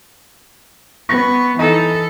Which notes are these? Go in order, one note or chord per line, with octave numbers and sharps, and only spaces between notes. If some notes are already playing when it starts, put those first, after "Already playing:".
B3 C#6
E3 D#4 A4